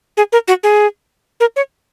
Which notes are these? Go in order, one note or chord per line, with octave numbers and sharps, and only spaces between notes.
G#4
A#4
F#4
G#4
A#4
C#5